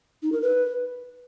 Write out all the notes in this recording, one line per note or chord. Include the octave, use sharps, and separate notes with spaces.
D#4
A#4
B4